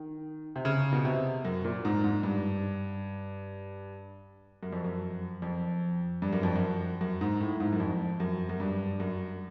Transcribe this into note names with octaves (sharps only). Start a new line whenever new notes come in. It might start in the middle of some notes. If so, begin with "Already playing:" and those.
Already playing: D#3
C3
C#3
B2
C3
F#2
A#2
G#2
G#2
G2
F#2
F2
F#2
F2
G2
F#2
F2
F#2
F#2
G#2
A2
G#2
F#2
F2
F#2
F#2
G2
F#2